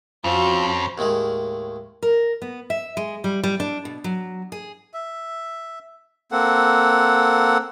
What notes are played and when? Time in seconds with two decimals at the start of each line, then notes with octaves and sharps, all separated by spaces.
0.24 F2 C#4 F4 F#4 A4 C5
0.98 D#2 A2 D#3 G#3
2.03 A#4
2.42 B3
2.70 E5
2.97 G#3
3.24 G3
3.44 G3
3.60 D4
3.85 B2
4.04 F#3
4.52 G#4
4.94 E5
6.31 A#3 C4 A4 F#5